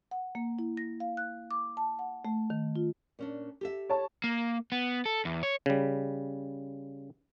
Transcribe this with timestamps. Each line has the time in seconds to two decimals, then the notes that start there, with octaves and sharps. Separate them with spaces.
0.11 F#5
0.35 A#3
0.59 E4
0.77 A#6
1.00 F5
1.17 F#6
1.51 D6
1.77 A5
1.99 F#5
2.25 A3
2.50 D#3
2.76 F4
3.19 A#2 C#4 D4
3.61 G4 A4 E5
3.89 C#5 A5
4.24 A#3
4.72 B3
5.06 A4
5.25 E2
5.43 C#5
5.66 C#3 G3